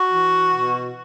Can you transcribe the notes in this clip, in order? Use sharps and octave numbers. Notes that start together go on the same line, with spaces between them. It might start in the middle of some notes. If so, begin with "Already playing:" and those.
Already playing: F#4
E3
B2